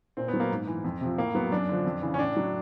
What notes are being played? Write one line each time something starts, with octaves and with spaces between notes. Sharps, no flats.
A#2 C4
B3
F#3
A#3
G#2
E3
F2
C3 F3
A2 A#3
F#3 B3
F#2 D4
D3 F3
F2
C#3 E3
C#4
A2 D4
F#3